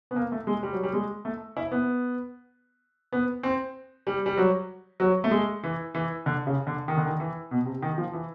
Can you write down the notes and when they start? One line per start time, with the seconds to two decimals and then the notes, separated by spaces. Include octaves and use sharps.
0.11 B3
0.16 A#3
0.32 A3
0.47 G#3
0.63 G3
0.73 F#3
0.83 G3
0.93 G#3
1.25 A3
1.57 E4
1.72 B3
3.12 B3
3.43 C4
4.07 G3
4.26 G3
4.37 F#3
5.00 F#3
5.24 A3
5.31 G#3
5.63 E3
5.95 E3
6.26 D3
6.47 C#3
6.67 D3
6.88 D#3
6.97 D3
7.06 D#3
7.20 E3
7.51 B2
7.66 C3
7.82 D#3
7.98 F3
8.13 E3